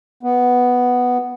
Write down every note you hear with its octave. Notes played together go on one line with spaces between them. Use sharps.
B3